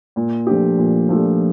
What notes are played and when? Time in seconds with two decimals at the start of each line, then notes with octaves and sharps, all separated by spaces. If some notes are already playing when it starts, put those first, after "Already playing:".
0.16 A#2
0.47 F3 A3 D4 G4
0.78 A#2
1.09 F3 A3 D4 G4